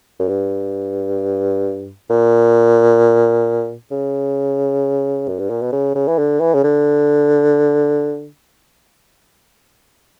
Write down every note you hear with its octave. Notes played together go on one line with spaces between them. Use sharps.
F#2
G2
A#2
C#3
F#2
G2
A#2
B2
C#3
C#3
E3
D3
E3
C#3
D3